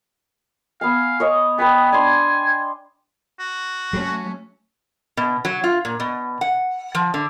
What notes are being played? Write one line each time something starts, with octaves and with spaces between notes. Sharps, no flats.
B3 F5 G#5
C#5 D#5 C#6
B3 B4 G5 G#5
D4 G#5 C6 D#6
F#4
F#3 A3 C#4
B2
F#3
F4
A#2
B2
F#5
F3
D3